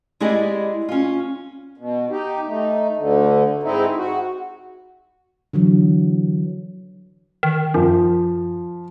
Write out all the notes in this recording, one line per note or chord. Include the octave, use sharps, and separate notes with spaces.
G#3 E4 G4 G#4 D5 D#5
C#4 F4
B2
D#4 G4
A3 D#4
D2 D3
G#2 C4 D#4 E4
F#4
D3 E3 F#3
D#3
F#2 F3